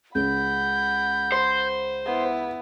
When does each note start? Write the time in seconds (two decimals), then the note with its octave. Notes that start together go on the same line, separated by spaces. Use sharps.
0.15 C#2 F#5 B5 G6
1.32 C5
2.06 B3 E4